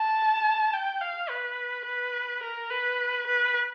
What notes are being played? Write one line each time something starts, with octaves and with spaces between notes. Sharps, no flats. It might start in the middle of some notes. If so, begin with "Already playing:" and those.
Already playing: A5
G5
F5
B4
B4
A#4
B4
B4